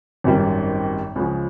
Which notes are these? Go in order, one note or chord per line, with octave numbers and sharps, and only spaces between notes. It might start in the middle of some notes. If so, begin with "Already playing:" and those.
G#1 F#2 D#3 G3
C#2 C#3 F3